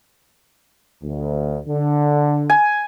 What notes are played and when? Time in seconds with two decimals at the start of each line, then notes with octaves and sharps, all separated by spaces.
1.03 D2
1.66 D3
2.50 G#5